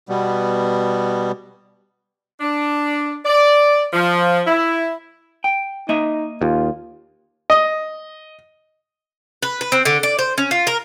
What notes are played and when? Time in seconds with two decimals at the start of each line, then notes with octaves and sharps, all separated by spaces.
0.09 B2 G3 B3
2.40 D4
3.25 D5
3.93 F3
4.46 E4
5.44 G5
5.89 A#3 D#4 D#5 E5
6.41 D#2 F4
7.50 D#5
9.43 B4
9.61 B4
9.72 C4
9.85 D3
10.03 D5
10.19 C5
10.38 C#4
10.51 F4
10.67 A#4